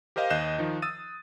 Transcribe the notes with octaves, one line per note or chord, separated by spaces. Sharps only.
G4 A#4 C5 D#5 F5
D#2 D#5 F#6 G6 C7 E7
D#3 F3 D#4
D#6 E6 A6 D#7